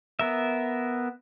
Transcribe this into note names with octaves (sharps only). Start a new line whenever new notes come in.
B3 A#4 E5